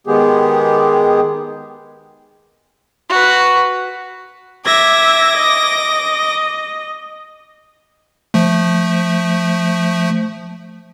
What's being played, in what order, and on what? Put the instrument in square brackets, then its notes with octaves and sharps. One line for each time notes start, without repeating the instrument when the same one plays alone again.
[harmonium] D#3 G#3 B3 G4 G#4
[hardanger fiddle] F#4 B4
[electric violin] E5 G#6 [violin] D6 A#6
[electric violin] D#5
[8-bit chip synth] F3 A3